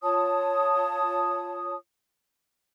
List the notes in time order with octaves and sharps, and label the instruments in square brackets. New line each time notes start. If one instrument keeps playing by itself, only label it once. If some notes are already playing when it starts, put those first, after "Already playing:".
[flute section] F4 C#5 A5 D#6